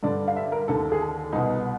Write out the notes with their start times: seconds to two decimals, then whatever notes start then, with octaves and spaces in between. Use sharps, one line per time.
0.03 G2 D3 D5
0.28 F5
0.36 E5
0.52 A#4
0.68 D#2 D3 A4
0.92 G#4
1.01 A4
1.32 C2 B2 D#4